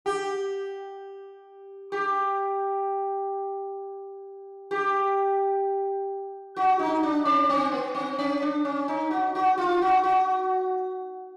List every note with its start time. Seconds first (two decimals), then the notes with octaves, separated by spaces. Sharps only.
0.06 G4
1.92 G4
4.71 G4
6.56 F#4
6.79 D#4
7.03 D4
7.25 C#4
7.49 C4
7.71 B3
7.95 C4
8.19 C#4
8.42 D4
8.65 C#4
8.88 D#4
9.11 F#4
9.35 F#4
9.58 F4
9.82 F#4
10.04 F#4